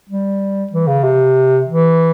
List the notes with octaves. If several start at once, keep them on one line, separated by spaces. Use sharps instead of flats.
G3
E3
C#3
C3
E3